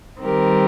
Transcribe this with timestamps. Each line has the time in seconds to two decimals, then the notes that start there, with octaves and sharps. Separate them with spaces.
0.19 D#3 G3 C4 G4 A#4